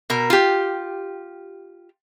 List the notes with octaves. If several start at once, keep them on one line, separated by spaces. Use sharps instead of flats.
B2 A#4
F4 G4